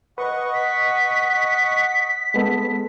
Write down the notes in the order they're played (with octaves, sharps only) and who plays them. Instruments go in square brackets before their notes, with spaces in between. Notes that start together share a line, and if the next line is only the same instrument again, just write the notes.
[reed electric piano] B4 [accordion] D#5 F#5 C#6
[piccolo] B6
[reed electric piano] G#3 B3 A4